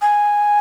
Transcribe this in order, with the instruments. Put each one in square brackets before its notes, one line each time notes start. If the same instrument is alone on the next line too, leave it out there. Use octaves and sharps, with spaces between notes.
[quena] G#5